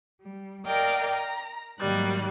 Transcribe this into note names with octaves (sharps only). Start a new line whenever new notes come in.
G3
A#4 D5 D#5 F5 G5 A#5
A#5
G#2 D#3 F#3 G3 A#3 F#6